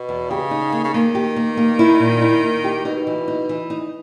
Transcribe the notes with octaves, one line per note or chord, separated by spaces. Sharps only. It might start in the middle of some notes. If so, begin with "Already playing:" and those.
Already playing: B2
E2
C#3 G4
D#4
A#3
C#3
D#3 A#3
G4
A#3
A#3
E4
A#2
E4
A#3
G4
B2 D#4
E3
D#4
E3
D#4